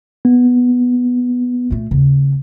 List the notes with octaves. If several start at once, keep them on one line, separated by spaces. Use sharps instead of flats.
B3
A#2 A3
D#2 C#3